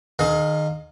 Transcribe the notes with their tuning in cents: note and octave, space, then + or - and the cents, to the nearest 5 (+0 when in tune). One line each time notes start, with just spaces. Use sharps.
D#3 -20 G#4 +30 F5 +25